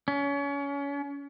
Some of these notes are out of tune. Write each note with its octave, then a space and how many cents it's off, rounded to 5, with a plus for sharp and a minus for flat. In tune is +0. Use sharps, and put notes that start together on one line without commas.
C#4 +30